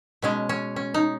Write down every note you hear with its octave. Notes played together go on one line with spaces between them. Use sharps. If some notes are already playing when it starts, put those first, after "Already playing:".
B2 G#3 C#4
C#4
C#4
D#4